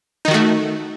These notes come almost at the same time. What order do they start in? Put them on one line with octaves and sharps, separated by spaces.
D#4 D#3 F#4 A3